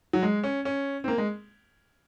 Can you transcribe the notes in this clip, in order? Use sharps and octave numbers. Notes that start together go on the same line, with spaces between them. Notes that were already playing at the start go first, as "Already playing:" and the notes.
F#3
G#3
C#4
C#4
C4
A#3
G#3